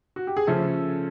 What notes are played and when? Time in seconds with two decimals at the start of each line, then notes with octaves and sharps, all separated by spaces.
0.16 F#4
0.27 G4
0.37 G#4
0.47 C#3 F3 A3 C#4 A4